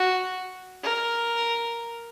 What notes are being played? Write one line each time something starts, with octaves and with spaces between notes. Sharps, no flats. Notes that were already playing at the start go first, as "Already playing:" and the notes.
Already playing: F#4
A#4